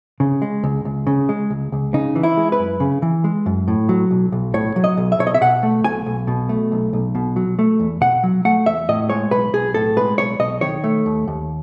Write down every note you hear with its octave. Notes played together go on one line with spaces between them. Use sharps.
C#3
G#3
C#2
C#2
C#3
G#3
C#2
C#2
C#3 D#4
E3
E4
G#3
B4
F#2
C#3
E3
G#3
F#2
A2
F#3
B1
B1
A2 C#5
F#3
D#5
B1
E5
B1 C#5
D#5
E5
B2 F#5
A3
B1 G#5
B1
B2
A3
B1
B1
B2
F#3
A3
E2
B2 F#5
F#3
A3 F#5
E2 E5
A2 D#5
G#3 C#5
B1 B4
B1 G#4
A2 A4
G#3 B4
B1 C#5
B1 D#5
D#3 C#5
A3
D#2
D#2